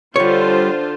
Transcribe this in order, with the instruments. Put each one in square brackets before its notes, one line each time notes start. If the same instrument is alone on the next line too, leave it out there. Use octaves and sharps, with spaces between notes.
[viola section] D3 F4 C5 [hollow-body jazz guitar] G3 C#5